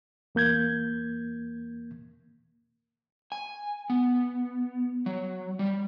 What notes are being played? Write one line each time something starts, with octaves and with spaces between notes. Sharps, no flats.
E2 A#3 G6 G#6
G#5
B3
F#3
G3